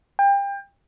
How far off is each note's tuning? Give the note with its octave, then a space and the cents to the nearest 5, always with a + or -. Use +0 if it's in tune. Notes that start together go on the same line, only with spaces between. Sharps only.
G5 +30